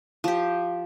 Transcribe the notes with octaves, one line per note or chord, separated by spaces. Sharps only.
F3 G4